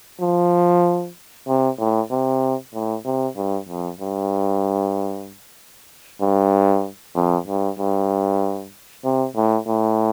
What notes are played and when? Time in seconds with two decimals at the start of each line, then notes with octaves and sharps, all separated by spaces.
0.20 F3
1.47 C3
1.79 A2
2.11 C3
2.74 A2
3.05 C3
3.36 G2
3.68 F2
4.00 G2
6.21 G2
7.15 F2
7.47 G2
7.79 G2
9.05 C3
9.36 A2
9.68 A2